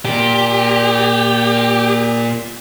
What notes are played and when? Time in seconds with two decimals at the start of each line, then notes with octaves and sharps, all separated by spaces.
0.05 A#2 G4